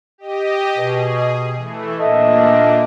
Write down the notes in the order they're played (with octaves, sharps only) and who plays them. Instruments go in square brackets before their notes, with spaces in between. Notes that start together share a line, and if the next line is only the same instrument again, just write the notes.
[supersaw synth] G4 D#5
[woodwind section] B2 [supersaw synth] G#4
[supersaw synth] E3 A3
[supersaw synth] A#2 A#3 D4 [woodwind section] A4 D#5 E5